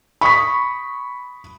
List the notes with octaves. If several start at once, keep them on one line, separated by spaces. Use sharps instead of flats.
B5 C#6 D#6 B6